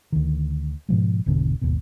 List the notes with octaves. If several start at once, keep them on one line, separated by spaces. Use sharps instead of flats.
D2 D#3
G#2 B2 F3 G#3
G#1 E2 B2 D3
G#1 D#2 B2